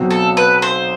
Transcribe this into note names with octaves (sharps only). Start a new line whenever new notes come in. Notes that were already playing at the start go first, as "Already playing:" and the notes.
Already playing: B1 B2 F#3 C4
A4
B4
C5